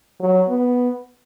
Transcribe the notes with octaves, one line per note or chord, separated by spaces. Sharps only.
F#3
B3